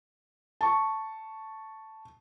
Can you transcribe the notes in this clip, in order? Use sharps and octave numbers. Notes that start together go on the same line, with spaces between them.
A5 C#6